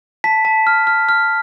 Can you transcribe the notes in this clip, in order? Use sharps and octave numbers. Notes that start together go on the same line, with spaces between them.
A5 B6
A5
F6
F6
F6